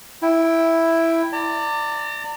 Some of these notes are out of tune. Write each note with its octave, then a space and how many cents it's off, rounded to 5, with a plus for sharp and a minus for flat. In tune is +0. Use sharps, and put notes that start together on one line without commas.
E4 +0 G5 +0
D5 +0 A#5 -45